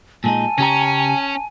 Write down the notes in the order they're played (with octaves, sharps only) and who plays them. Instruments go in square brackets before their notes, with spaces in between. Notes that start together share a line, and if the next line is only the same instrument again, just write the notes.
[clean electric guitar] A#2 G#3 D#4 [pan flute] G#5 [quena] A5
[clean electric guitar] C#3 G4 A#5 [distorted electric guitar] C#4